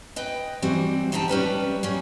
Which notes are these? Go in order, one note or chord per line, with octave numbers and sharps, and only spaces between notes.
B4 D#5 G5
E3 G3 C4 F#4
E2 D3 G3 D#4 G5 A5
G3 C#4 B4 E5
G3 A#3 C#4